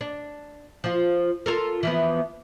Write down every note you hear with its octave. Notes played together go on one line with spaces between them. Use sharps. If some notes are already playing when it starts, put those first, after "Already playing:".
D4
F3 F4
F4 A4 A#4
E3 F3 B3